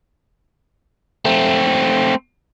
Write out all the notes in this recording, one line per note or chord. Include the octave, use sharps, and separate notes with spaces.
A3 C4